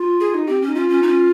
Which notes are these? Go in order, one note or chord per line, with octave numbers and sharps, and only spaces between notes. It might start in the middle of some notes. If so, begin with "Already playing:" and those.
Already playing: F4
G#4
D#4
C4 G4
C#4
D#4
C#4 F4
C#4
D#4
C#4